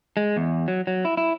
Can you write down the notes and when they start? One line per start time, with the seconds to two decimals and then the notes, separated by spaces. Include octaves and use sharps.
0.17 G#3
0.37 E2
0.68 F#3
0.87 F#3
1.05 E4
1.17 E4